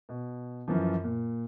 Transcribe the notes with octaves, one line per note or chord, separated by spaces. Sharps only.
B2
F#2 E3 F3
A#2